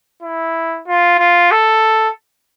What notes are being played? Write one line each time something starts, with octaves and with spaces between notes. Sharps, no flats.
E4
F4
F4
A4